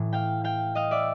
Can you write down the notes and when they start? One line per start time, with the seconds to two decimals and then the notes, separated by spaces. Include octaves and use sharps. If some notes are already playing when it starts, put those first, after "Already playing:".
Already playing: A2 E3
0.13 F5 G5
0.44 F5 G5
0.75 D#5 F5
0.91 D5 E5